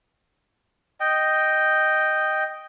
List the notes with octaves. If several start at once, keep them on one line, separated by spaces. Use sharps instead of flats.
D#5 G5